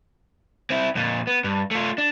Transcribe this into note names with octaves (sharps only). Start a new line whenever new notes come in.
C4 E4
F2 A#2
B3
G2
A3 F4
D4